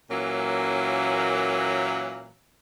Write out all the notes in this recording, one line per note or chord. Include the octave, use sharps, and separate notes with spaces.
A#2 E3 F#3 A#3 C#4